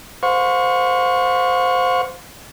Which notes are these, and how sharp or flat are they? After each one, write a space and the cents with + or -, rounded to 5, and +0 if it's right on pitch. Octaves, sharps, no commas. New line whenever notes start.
C5 -15 F5 +45 C#6 +0